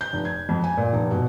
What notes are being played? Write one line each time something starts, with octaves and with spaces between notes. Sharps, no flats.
G6
F1
G#6
F2
G#5
A#2
F1
B2